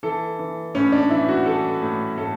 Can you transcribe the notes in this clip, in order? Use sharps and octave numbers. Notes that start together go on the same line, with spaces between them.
E3 A4
E3
A2 C#4
D4
E3 E4
F#4
E3 A4
A2
A2 A4